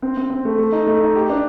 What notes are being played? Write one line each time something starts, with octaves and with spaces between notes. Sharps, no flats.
C4
C4
C4
A3
A3
D#4
A3
D#4
G4
D4